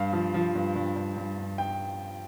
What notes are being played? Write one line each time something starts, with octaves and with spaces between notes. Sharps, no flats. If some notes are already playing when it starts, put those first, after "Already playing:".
Already playing: G2 F5
F3
F3
G2
G2
G2
G2
G2
G5